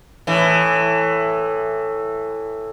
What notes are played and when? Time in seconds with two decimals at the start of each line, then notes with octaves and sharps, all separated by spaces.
0.27 A2 E3